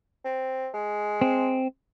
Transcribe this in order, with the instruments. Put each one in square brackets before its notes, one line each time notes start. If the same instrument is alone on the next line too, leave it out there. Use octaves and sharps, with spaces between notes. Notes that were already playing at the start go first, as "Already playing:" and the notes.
[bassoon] C4
G#3
[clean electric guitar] C4